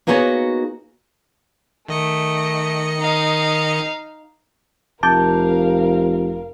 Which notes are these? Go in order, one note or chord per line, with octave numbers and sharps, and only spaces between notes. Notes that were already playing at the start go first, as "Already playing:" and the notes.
A#3 B3 D#4 F#4 G#4 C#5
D#3 A3 D#5 C#7
D#4 F5
F1 A#4 F5 A5 D6 G6